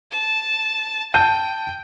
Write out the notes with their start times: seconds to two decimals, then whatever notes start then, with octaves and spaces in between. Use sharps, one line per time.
0.11 A5
1.14 G5 A5 G6 D#7